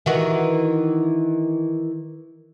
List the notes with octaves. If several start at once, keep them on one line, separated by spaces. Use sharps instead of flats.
D#3 E3 F#4